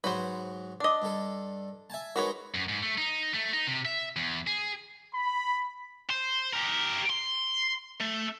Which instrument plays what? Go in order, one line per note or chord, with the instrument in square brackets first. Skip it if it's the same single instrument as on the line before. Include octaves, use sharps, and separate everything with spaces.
[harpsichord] G#2 F#3 F#4 [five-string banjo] B4 C5
[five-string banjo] D4 D#5
[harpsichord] G2 A4
E5 G#5 A5
[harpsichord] G#3 D#4 A#4 [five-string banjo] F#4 B4 C#5
[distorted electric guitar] F#2
G#2
A3
D#4
A3
D#4
C3
E5
E2
G#4
[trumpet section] B5
[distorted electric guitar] C5
G4 A#4
C6
A3